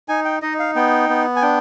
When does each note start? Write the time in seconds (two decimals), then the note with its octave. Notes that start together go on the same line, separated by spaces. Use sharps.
0.09 D#4 G#5
0.25 G5
0.42 D#4 D#5
0.59 F5
0.76 B3 G5
1.10 B3
1.36 G#5
1.42 D4 G5